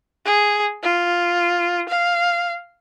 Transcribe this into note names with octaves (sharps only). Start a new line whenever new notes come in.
G#4
F4
F5